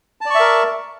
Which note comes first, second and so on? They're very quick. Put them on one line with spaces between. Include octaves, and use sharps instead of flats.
A5 D5 C#6 E5 A#4